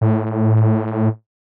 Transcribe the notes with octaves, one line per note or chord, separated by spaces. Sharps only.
A2